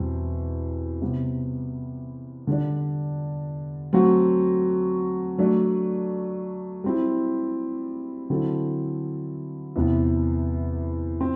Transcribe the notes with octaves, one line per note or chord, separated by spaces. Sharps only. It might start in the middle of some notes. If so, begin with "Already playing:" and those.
Already playing: E2 B2 G3 C4
C3 G3 B3
D3 G3 D4
F#3 A3 C4 F#4
F#3 A3 D4
G3 C4 E4
D3 F#3 C4 E4 A4
E2 C3 E3 B3
C4